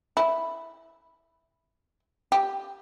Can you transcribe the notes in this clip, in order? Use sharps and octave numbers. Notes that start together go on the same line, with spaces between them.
E4
G4